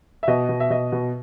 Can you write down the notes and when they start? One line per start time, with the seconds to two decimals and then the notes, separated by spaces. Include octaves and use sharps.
0.23 E5
0.28 B2 D#5
0.49 B2
0.60 E5
0.70 B2 D#5
0.92 B2